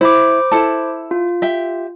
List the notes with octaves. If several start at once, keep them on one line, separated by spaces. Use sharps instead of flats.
E4 C5 B5 D6
E4 A4 A5
F4
G4 E5